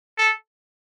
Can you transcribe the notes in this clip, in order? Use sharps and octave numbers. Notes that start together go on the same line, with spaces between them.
A4